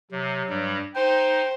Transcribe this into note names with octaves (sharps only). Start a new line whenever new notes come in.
C3 F#3
G2 G3
D#4 C5 G5